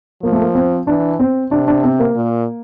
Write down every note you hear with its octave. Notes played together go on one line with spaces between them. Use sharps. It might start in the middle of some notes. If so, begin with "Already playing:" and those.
F3 A#3
A3
A#3
C4
E3 D4
C4
C3 D4
D4
C4
A#3
A#2